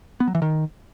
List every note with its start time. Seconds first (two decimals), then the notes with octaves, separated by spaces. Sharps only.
0.20 B3
0.28 F#3
0.35 E3
0.42 D#3